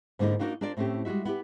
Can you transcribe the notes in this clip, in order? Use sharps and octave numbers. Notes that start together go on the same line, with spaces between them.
G#2 D3 A#3 D#4 E4
A#3 B3 D4 D#4 F#4 A#4
D4 F4 A#4 C5 D5
A2 A3 C4 C#4 G4
G3 G#3 F4 F#4 E5
B3 E4 G4